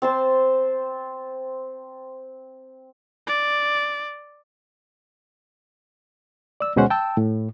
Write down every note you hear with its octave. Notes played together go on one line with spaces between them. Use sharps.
C4 A5 C6
D5
D5 E6
D2 B2 G#3 C#4 C5 F#5
G5 A5 E6
A2